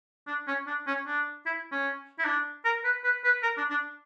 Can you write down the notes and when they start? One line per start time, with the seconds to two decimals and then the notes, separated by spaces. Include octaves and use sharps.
0.27 D4
0.47 C#4
0.67 D4
0.87 C#4
1.07 D4
1.46 E4
1.72 C#4
2.19 E4
2.25 D4
2.65 A#4
2.84 B4
3.04 B4
3.24 B4
3.43 A#4
3.57 D4
3.70 D4